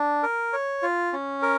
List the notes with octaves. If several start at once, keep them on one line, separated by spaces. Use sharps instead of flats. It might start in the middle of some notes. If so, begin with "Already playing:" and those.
Already playing: D4
A#4
C#5
F4
C#4
A#4